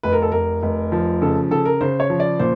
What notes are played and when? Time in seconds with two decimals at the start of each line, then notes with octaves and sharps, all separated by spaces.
0.03 F1 B4
0.13 A#4
0.22 A4
0.32 F1 A#4
0.63 F1
0.92 F3
1.22 C#3 A4
1.51 C#3 A4
1.65 A#4
1.81 C#3 C5
2.00 C#5
2.10 F3
2.20 D5
2.39 A#2 C5